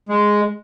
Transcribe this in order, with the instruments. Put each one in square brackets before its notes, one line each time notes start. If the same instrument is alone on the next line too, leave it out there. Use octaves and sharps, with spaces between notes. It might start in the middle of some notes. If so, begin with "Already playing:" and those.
[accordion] G#3